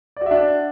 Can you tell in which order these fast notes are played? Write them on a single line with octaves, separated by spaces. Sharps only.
D5 F#4 E5 D4